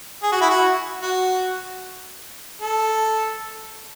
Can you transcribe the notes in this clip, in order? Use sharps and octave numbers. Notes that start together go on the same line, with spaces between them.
G#4
F#4
E4
F#4
F#4
A4